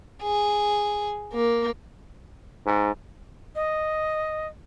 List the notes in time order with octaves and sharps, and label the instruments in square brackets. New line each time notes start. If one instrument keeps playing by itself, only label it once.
[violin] G#4
A#3
[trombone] G#2
[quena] D#5